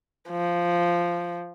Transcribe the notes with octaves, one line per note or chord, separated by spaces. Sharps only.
F3